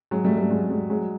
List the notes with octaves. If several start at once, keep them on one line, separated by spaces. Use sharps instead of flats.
F#3 G#3
G3 A3
G3 A3
F#3 G#3
F#3 G#3
F#3 G#3